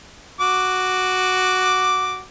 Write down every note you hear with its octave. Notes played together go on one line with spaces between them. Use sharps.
F#4 D6